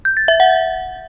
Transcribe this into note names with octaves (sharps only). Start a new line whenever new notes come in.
G6
A6
E5
F#5